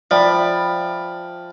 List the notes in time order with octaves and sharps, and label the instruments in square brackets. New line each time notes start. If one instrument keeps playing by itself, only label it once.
[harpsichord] F3 [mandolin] B4 B5 [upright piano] D5 [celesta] E5 G5